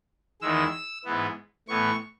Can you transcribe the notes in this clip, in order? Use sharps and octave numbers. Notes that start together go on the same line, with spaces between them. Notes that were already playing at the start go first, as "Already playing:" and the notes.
E2 D#3 G#3 E6
G#2 E3 B3
A2 E3 B3 C#6